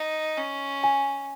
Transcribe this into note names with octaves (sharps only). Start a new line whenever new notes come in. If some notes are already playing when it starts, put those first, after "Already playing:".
Already playing: D#4
C#4
G#5